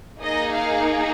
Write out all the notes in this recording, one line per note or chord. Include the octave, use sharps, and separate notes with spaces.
A#3 D#4 G#4 D#5
F5